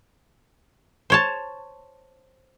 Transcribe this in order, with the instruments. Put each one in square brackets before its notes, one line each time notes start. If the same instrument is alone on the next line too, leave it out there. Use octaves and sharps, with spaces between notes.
[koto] C5 C#5 A5